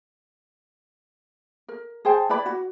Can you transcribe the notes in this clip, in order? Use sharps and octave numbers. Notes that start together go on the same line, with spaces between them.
A#4
G#4 C5 G5 A5
E4 B4 D5 B5
F#4